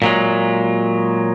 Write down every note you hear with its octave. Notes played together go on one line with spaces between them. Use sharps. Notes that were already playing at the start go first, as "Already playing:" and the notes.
A#2 F#3 G#3